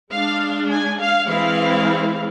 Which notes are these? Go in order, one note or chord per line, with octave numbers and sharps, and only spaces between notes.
G#3 D4 F5
G#5
F5
E3 G#3 C4 E4 F5